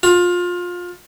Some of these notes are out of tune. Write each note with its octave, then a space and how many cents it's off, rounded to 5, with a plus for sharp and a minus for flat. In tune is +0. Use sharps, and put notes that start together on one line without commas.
F4 +25